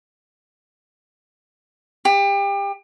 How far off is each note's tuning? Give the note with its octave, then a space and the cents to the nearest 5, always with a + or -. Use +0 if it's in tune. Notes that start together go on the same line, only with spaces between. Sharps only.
G4 +30